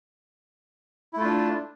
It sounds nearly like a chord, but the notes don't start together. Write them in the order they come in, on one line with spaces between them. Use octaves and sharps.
E4 A3 F4 D4